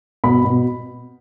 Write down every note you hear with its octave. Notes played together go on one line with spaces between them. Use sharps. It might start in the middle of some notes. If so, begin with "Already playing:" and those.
B2 B5
B2